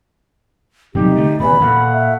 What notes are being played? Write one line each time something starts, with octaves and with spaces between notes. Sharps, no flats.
C3 F#3 G3 D#4 G4
D3 A3
E2 B2 D#3 E3 B5
A#2 A3 F5 F#5
E5